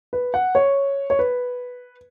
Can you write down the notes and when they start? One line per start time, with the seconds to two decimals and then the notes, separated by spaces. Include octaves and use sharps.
0.13 B4
0.34 F#5
0.55 C#5
1.10 C#5
1.19 B4